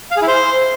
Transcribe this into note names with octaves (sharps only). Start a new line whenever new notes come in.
F5
G#4
E4
C5